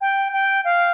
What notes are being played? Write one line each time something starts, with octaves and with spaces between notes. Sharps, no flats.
G5
G5
F5